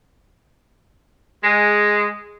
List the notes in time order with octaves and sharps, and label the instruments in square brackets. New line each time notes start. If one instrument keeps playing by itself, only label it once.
[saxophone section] G#3